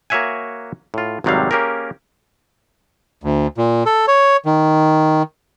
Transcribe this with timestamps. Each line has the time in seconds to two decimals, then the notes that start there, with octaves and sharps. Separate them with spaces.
0.10 A#3 F#4 C#5 E5 F#5 G#5
0.94 A2 F4
1.24 G#1 F2 C3 F#3 G3 F5
1.51 A#3 C#4 G4 G#4 A#4
3.24 D2
3.58 A#2
3.86 A4
4.08 C#5
4.45 D#3